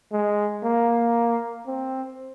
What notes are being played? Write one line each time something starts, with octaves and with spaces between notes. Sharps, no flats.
G#3
A#3
C4